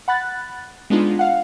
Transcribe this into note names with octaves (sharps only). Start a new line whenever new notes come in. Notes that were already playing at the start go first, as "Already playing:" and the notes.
F#5 B5 F#6 A6
G#3 B3 D4 D#4 F4
F5 F#5